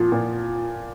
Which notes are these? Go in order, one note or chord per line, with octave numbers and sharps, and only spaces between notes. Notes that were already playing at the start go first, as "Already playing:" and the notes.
Already playing: A#2 F3
A#2